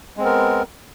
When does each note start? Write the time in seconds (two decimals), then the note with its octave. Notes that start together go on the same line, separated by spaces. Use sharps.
0.17 G#3
0.20 C4
0.22 B3
0.25 A#4